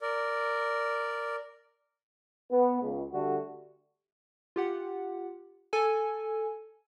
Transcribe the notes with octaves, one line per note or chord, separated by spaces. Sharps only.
A#4 D5
B3
C#2
D3 G3 A3 F#4
F4 G4 F#5
A4 G#5